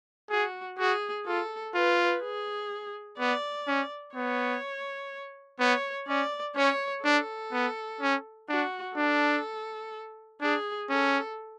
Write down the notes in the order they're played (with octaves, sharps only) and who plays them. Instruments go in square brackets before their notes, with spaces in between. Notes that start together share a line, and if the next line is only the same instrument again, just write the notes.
[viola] F#4 [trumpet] G#4
[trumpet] F#4 [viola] G#4
[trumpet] F4 [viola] A4
[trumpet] F4 [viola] B4
[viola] G#4
[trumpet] B3 [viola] D5
[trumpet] C#4
[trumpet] B3 [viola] C#5
[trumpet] B3 [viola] C#5
[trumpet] C#4 [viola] D5
[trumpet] C#4 [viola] C#5
[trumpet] D4 [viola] A4
[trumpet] B3
C#4
[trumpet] D4 [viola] F#4
[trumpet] D4 [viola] A4
[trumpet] D4 [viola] G#4
[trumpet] C#4 [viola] A4